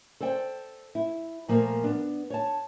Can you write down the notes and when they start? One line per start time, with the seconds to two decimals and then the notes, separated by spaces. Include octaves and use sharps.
0.20 A4 C5 D5 G5
0.95 E4
1.48 A#2 F3 A3 A#3
1.84 B3 D4
2.30 C#5 A5